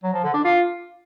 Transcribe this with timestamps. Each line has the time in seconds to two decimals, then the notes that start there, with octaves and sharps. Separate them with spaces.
0.03 F#3
0.14 F3
0.24 D3
0.34 D4
0.44 F4